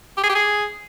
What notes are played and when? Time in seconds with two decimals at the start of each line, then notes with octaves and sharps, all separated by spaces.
0.18 G4
0.24 G#4
0.29 G4
0.35 G#4